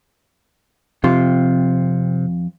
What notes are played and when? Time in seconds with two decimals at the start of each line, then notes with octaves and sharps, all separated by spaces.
1.04 F2 C3 F4